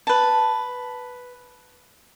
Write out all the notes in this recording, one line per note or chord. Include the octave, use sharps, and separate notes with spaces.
B4 A5